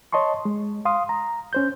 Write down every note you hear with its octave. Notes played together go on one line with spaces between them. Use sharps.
C#5 D#5 A5 C6 C#6
G#3
F5 C6 D#6
A#5
C#4 C5 G6